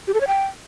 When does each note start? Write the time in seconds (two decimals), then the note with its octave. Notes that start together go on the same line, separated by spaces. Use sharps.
0.07 G4
0.14 A4
0.21 C#5
0.27 G5